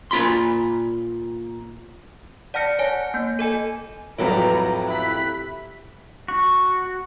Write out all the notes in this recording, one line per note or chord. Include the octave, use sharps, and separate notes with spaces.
A#2 F4 B5 C6
D5 F#5 A5 F6 A#6 C#7
C#5 G#5 A#6
A#3 G6
A4 D#5 G#5
F2 A2 C3 E3 F#3 G3 B4 A#5
E4 F#6 B6
F#4